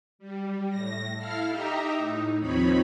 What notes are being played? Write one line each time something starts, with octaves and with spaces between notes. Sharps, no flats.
G3
A2 A#6
E4 A4 F5 F6
D#4 G4 D#5 E5 A#5
A2 D#4
D#2 F3 C4 D#4 C#5 B5